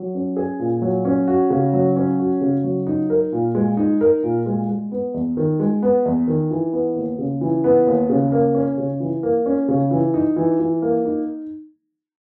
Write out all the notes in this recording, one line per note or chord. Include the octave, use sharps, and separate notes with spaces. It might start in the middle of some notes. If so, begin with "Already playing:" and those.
Already playing: F#3
C#4
G#4
A#2
F#3
C#4
F#4
C#3
F#3
C#4
F#4
C#3
F#3
D#4
A#4
A#2
G#3
D#4
A#4
A#2
G#3
G#3
B3
E2
D#3
G#3
B3
E2
D#3
E3
B3
D#2
C#3
E3
B3
D#2
C#3
A#3
C#4
C#3
E3
A#3
C#4
C#3
E3
D#4
E3
E3
A#3
D#4